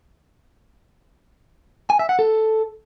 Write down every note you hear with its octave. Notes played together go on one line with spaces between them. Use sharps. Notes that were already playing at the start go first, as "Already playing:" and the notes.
G#5
E5
F#5
A4